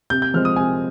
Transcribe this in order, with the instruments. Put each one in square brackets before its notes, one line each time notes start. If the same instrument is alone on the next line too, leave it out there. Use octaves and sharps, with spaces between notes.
[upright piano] C3 [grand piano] G6
[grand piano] G6
[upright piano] F3 G#3 C4 [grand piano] F6
[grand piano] D#6
[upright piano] C3 [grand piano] G#5